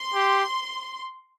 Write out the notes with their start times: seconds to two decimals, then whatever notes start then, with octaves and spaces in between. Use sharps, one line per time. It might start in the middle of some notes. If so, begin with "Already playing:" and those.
Already playing: C6
0.14 G4